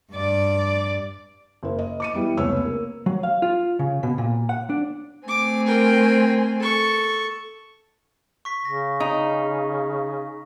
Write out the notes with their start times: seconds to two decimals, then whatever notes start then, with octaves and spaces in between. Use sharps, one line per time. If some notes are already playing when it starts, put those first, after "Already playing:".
0.12 G2 D5
1.63 F#1 A#3
1.79 D#5
2.00 D6 C#7 D#7
2.14 E3 G3 B3 E4
2.37 F1 C#2 B3 C#5 E6
2.65 A#3
3.06 F#3
3.23 F5
3.42 F4
3.79 C#3
4.03 B2
4.18 A#2
4.49 F#5
4.70 D4
5.28 A3 C4 G#5 D6
5.66 A#4 G5
6.59 A4 C#6
8.45 C#6 B6
8.65 C#3 A#6
9.00 D#4